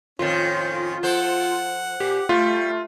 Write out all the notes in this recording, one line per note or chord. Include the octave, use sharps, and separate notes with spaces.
F2 A2 D#3 C#4 F4
F3 A4 C5 F#5
A#2 G4
G3 A3 F4